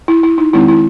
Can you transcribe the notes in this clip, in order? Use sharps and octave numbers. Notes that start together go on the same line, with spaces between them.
E4
E4
D#4
D#3 G#3 C4 D#4 E4
E4